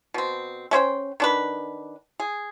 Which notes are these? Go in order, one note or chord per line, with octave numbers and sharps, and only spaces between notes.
B2 C4
A3 C#4 C5 G5
D#3 D4 B4
G#4